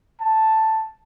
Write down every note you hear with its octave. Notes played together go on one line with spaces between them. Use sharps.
A5